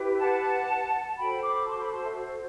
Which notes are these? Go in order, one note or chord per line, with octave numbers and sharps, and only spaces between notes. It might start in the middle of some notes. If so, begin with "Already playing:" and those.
Already playing: E4 G4 B4
F#5 A5
F#4 A4 C5 G5 B5
B5 D6
A5 C6
B5 D6
A5 C6
E5